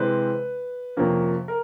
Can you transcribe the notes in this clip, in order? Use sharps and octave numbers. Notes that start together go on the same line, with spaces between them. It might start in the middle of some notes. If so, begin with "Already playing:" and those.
Already playing: C3 E3 G#3 C4 B4
F2 C3 F3 A#3 C#4
A#4